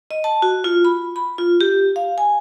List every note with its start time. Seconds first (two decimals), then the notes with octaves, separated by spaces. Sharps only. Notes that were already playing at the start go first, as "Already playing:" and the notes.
0.11 D#5
0.24 A5
0.42 F#4
0.64 F4
0.85 B5
1.16 B5
1.38 F4
1.61 G4
1.96 F5
2.18 G#5